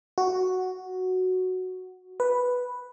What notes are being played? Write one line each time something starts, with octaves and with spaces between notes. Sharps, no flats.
F#4
B4